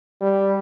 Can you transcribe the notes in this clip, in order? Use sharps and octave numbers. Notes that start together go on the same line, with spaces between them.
G3